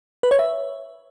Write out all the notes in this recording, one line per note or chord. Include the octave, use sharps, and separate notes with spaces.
B4
C#5
E5